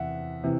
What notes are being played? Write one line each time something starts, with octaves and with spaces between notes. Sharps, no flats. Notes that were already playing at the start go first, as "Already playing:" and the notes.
Already playing: E2 C3 E3 E5 F#5
C3 E3